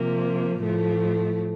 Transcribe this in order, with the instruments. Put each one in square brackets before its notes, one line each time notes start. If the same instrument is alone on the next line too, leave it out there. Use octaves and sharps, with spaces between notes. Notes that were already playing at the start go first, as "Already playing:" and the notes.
Already playing: [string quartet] C3 F3 A#3
A2 F3 A3